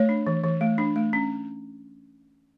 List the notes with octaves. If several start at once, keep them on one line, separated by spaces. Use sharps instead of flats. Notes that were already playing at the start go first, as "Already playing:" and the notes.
Already playing: A3 C#5
D4
E3
E3
A3
D4
A3
C#4